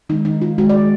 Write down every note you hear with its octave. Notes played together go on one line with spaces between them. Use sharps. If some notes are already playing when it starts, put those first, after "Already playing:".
D#3 G#3 D#4
D#4
F4
D#3 G#3 F#4
D5